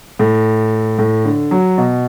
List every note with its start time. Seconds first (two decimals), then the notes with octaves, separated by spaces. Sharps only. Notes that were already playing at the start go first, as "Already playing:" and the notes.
0.19 A2
0.98 A2
1.25 D3
1.51 F#3
1.78 B2